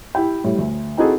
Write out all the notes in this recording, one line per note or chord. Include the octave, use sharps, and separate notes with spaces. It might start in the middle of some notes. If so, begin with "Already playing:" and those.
E4 G4 G5
A2 G3
D2
C4 D#4 E4 F#4 G#4 A4